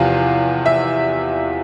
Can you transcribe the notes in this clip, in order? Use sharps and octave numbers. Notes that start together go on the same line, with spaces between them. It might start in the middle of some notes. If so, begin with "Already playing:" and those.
Already playing: E2 C3 F3 F5
E5